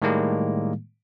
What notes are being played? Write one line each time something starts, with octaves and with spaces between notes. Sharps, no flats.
A2 D#3 G3 G#3 A#3